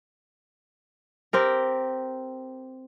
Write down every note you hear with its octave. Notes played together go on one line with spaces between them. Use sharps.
C4 G4 A#4